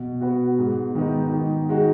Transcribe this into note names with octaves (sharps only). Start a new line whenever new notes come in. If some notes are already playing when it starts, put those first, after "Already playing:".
Already playing: B2
B3 F#4
G#2
D#3 G#3 B3 D#4
D#3
G#3 D#4 F#4